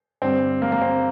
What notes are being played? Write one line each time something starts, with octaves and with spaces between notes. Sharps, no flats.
G2 D3 C4
A#3
A#3
C4